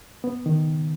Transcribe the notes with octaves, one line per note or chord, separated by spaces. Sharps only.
B3
D#3